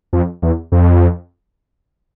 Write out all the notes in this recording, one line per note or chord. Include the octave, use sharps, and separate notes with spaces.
F2
E2
F2